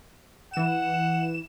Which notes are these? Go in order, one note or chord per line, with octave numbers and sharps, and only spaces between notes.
E3 F#5 E7